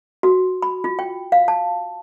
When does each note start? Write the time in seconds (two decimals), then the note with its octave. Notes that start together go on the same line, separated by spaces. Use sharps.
0.23 F#4
0.62 B5
0.84 F4
0.99 G5
1.32 F5
1.48 A5